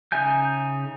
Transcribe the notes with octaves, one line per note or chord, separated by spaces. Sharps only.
C#3 D#4 E5 G#5 G6